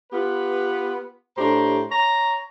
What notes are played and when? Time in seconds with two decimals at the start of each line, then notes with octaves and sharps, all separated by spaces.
0.12 B3 F4 G4 B4
1.37 A2 D4 G4 C5 A#5
1.91 C#5 A#5